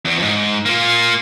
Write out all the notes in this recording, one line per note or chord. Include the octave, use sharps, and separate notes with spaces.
E2
F2 G#2
A#3 F4